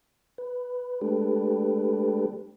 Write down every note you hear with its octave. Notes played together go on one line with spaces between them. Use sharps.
B4
G#3 A3 D4 G4 A4 B4